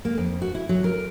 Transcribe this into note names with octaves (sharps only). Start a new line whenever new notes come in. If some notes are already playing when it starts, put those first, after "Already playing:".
A#3
F2
F#4
E4
F#3
A#4